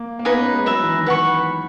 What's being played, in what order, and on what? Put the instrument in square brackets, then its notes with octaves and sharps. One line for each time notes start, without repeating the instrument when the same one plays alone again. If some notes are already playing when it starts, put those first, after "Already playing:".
Already playing: [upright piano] A#3
A#3
[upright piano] B3 [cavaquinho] D#4 G#4 B4
[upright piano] C#4
G#3
[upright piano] F#3 [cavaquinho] B4 E5 A#5
[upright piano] E3
D#3
[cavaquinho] B4 F#5 C#6